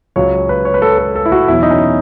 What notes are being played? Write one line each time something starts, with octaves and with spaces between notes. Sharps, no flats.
C#2 C#3 F#3 C#5
B4
C#5
B4
A4
A4
A4
E4
F#4
E2 B2 F#3 E4
D#4
C#4